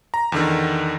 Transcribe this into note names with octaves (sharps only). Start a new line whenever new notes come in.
A#5
E2 D3 D#3